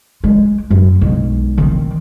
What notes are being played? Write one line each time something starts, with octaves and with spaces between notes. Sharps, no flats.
G#3
F#2
B1 G#3
D#3 C4